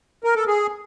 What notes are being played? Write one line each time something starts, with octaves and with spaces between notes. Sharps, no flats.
A#4
A4
G#4